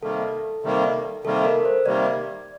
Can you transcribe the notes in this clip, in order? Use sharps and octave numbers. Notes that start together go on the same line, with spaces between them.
C3 D#3 G3 A#3 A4
C3 D#3 G3 A#3
C3 D#3 G3 A#3 A4
A#4
C5
C3 D#3 G3 A#3 D5